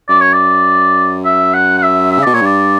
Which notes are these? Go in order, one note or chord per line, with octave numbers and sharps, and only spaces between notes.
F#2 D5
C#5
D5
E5
F#5
F#5
E5
E5
C#3
B2 D5
A#2 C#5
G2 D5